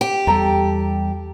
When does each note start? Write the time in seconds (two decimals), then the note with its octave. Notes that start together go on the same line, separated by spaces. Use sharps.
0.01 G4
0.27 E2 G3 A4 G5 A#5